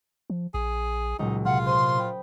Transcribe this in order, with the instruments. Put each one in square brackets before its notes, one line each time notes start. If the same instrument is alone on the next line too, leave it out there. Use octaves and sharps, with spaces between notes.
[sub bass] F3
[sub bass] A#1 [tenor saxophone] G#4
[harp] C#2 A#2 F#3 [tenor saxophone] D#4
[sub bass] C3 [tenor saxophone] F4 [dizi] F#5
[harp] C5 D#7 [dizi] C6
[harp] G5 B5 D#6